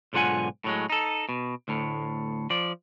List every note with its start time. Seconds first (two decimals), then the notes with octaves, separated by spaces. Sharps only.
0.13 B1 G#2 D3 F4 F#5 G#5
0.64 A2 F#3 G#3
0.90 D#4 A4
1.29 B2
1.68 D2 A2
2.50 F3 D5